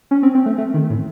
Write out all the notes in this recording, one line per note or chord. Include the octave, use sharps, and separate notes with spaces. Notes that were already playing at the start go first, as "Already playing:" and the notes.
C#4
C4
C4
A3
A3
D#3
A2